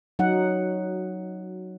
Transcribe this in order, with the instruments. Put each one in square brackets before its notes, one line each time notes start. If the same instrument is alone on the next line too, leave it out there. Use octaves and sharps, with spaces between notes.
[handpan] F#3 D#4 F#5